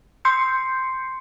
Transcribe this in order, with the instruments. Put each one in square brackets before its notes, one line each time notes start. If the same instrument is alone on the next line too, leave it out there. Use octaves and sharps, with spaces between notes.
[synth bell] C6 G6 C7 C#7